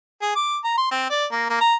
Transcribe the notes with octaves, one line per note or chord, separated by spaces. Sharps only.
G#4
D6
A#5
C6
C4
D5
A#3
A#3
A#5